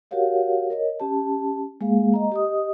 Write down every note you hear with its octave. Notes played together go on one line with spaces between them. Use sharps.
F#4 G4 A#4 C#5 F5 F#5
A#4 C#5 D#5
C#4 G4 A5
G#3 A#3 G#4 F5
D#5 A#5
G4 D#5 D#6